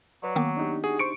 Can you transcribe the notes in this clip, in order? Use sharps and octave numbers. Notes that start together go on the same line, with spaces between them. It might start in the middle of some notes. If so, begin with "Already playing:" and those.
F#3 B4 D5
D#3 A#3 B3 F5 G5 D6
D4 D#4 G4
F#4 G#4
C5 C#6 C#7 D7